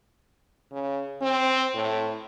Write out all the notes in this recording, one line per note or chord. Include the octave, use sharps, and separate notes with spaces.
C#3
C4
A2